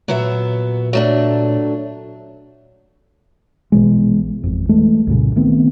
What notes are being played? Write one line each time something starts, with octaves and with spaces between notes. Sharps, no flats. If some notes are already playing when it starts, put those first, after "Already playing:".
A#2 F#3 B3 E5
F#3 A3 D4
A#1 B2 E3 G#3
G#1 F2
E3 G#3 A3
C2 F#2 A#2 C#3
D#3 A3 B3 C4